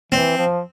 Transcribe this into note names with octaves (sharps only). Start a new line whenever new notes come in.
E3 C4
F3